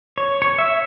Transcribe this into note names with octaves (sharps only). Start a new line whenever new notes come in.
C#5
C#5
E5